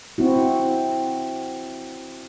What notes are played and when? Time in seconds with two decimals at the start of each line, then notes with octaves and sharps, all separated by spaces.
0.18 C4 E4 F#4